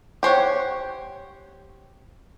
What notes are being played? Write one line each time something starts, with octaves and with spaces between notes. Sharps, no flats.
G4 C5 C#5 F#5